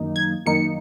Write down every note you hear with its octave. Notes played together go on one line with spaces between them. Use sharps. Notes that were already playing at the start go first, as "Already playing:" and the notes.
Already playing: F#2 D#3 A#3 D#4
G#6
F#2 D#3 A#3 D#4 C#7